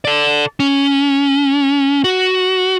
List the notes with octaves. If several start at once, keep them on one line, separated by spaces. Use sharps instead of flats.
A4 D5
C#4
F#4